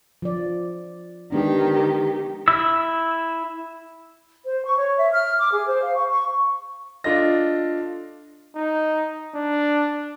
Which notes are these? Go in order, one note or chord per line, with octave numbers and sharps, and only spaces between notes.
F3 D5
D#3 G#3 B3 D4 G4
E4 E6
C5
C#6
C#5
E5
F6
D6
G#4
C5
F5
C#6
C#6
D4 F4 A4 D#5 A#6
D#4
D4